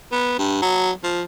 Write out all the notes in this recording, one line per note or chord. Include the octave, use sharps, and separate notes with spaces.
B3
G2
F#3
F3